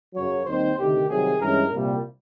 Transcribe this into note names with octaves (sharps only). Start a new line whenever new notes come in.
F#2 C#3 F#3 C#5
D#2 D#3 G3 C4 D#4 C5
D2 C3 D#3 G4
C2 C3 D#3 F#3 G#4
G2 E3 G#3 C#4 A#4
C2 A#2 G3